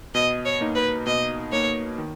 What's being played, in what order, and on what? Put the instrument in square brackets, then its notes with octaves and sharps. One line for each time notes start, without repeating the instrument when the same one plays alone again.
[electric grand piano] B2 [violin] D#5
[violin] C#5
[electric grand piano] A#3 D#4
[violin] B4
[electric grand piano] B2 [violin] D#5
[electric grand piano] A#3 D#4 [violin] C#5
[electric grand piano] D#3